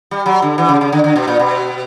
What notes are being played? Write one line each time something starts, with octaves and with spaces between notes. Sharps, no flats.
G3
F#3
D3
E3
C#3
C#3
D3
D3
B2
A#2
B2